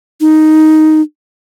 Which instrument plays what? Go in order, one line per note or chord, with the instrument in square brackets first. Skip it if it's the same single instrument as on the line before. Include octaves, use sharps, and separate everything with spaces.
[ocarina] D#4